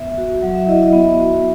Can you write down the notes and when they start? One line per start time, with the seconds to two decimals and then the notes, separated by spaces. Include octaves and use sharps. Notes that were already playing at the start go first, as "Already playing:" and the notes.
Already playing: B3 E5
0.18 F#4
0.42 F#3 F#5
0.55 E5
0.67 E4 D#5
0.83 E5
0.93 B3
1.18 F#4